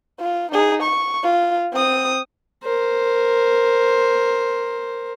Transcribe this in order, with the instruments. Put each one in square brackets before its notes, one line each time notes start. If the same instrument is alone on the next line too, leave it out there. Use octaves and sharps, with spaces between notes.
[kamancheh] F4
D#4 G#4
C#6
F4
C4 D#6
[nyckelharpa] A#4 C5